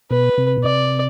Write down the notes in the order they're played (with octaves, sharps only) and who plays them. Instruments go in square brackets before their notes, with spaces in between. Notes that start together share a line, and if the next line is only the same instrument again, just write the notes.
[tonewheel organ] B2 [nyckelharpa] B4
[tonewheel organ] C3
B2
[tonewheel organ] C3 [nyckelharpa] D5